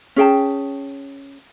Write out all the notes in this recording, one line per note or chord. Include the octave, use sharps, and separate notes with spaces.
C#4 G#4 G5 A5